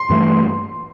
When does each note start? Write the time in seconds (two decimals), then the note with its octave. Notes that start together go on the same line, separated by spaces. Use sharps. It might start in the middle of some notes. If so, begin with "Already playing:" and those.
Already playing: C6
0.10 G2 E3 A3